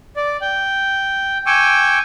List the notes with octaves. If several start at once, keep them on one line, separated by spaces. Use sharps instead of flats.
D5
G5
G5 G#5 C#6 D6 E6